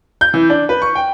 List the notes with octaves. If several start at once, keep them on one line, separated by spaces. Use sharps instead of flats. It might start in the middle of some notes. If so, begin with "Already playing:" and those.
G6
E3
D4
B4
C#6
G5